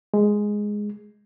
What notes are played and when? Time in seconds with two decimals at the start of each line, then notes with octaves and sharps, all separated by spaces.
0.14 G#3